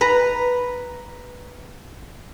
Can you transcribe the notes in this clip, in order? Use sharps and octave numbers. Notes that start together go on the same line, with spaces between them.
B4 A#5